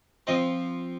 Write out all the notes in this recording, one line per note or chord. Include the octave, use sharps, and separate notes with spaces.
F3 C4 D#5